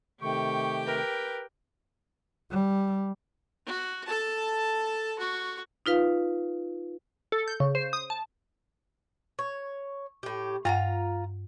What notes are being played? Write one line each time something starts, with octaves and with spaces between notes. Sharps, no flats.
C3 D#3 A3 G4 G5 C#6
A#4 B4
G3
F#4
A4 A5
F#4 C#6
D#4 F4 B4 F5
A4
G6
C#3
C5
D#6
A5
C#5
A2 G4
G2 F4 F#5 A#5